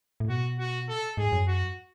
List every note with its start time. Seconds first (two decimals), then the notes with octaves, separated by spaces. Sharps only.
0.20 A2
0.29 B2 F#4
0.59 F#4
0.89 A4
1.17 G#2 G#4
1.32 F#2
1.47 F#4